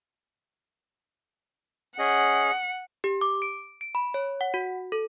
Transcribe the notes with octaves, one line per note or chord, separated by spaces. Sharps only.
C#4 G#4 D#5 F#5
G4
D6
D7
D7
B5
C#5
F#5
F#4
A4